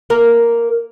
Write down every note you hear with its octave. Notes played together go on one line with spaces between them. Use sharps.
A#3 A#4